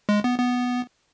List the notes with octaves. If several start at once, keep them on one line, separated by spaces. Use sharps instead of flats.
G#3
B3
B3